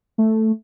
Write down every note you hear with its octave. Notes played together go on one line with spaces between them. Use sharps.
A3